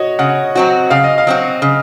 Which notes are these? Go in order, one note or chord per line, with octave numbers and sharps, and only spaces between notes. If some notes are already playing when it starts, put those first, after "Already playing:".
Already playing: F#4 C#5 D#5
C#3 F#5
F#3 C4 F#4
C#3 F5
D#5
F5
F#3 C4 F#4
C#3